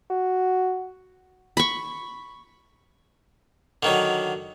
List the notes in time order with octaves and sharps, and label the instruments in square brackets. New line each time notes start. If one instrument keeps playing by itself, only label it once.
[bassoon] F#4
[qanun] B5 C#6
[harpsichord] D3 D#3 F#3